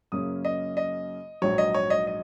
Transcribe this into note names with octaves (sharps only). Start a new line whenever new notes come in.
F#2 C#3 A#3 C#4 D#6
D#5
D#5
A#1 G#2 F#3 C#5
D#5
C#5
D#5
D#5